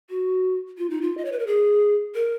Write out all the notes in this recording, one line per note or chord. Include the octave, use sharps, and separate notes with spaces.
F#4
F4
D#4
F4
D#5
C#5
B4
A#4
G#4
A#4